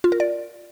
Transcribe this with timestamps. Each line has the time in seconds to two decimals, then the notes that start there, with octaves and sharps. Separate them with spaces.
0.04 F4
0.12 A#4
0.20 D5